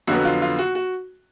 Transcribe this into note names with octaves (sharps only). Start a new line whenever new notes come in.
F2 D3 F#3 B3 F#4
F4
F4
F#4
F#4